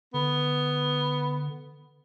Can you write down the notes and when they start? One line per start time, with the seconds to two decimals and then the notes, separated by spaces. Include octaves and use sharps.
0.14 D3 B3